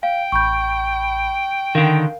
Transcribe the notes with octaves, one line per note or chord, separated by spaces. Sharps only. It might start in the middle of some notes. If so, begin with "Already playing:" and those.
F5 G5
A1 B5 C#6 G6
D3 D#3 A#4 F5